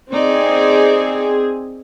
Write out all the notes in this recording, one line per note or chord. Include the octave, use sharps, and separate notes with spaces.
C4 D#4 G#4 D5